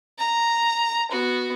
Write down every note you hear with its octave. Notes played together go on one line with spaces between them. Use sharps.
A#5
B3 F#4